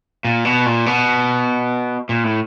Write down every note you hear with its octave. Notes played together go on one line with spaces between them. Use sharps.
A#2
B2
A#2
B2
A#2
A2